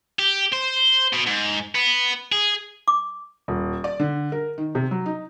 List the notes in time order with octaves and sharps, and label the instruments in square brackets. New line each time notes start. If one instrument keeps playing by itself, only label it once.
[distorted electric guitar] G4
C5
B2
G#2
B3
G#4
[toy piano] D6
[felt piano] D#1
D5
D3
A#4
D#3
C3
F#3
D#4